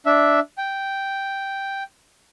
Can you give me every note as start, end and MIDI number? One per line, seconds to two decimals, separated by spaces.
0.06 0.40 62
0.06 0.40 76
0.58 1.83 79